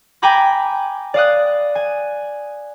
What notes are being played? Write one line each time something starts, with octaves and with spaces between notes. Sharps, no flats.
G5 G#5 A#5 B5 D6 G6
D5 F5 D#6 F#6
G#5